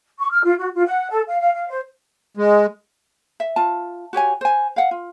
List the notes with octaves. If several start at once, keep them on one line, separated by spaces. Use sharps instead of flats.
C#6
F6
F4
F#4
F4
F#5
A4
F5
F5
F5
C5
G#3
E5
F4 A5
F#4 G4 C#5 G#5
C5 G#5
F5 F#5
F4